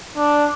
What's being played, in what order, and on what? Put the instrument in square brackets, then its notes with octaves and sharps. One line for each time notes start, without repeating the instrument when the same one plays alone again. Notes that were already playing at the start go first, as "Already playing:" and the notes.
[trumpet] D4